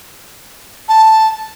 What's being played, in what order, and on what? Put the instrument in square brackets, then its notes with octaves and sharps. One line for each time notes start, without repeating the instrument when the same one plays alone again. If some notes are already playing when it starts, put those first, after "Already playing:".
[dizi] A5